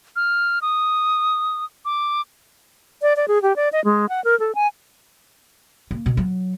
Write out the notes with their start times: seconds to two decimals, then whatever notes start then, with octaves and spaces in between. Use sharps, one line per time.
0.16 F6
0.62 D#6
1.85 D6
3.02 D5
3.17 D5
3.28 G#4
3.42 G4
3.56 D5
3.73 D#5
3.85 G#3
4.09 F#5
4.24 A#4
4.40 A4
4.55 G#5
5.91 A#3
6.06 B2
6.17 F#3